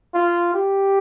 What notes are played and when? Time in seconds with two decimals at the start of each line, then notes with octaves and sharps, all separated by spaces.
0.14 F4
0.54 G4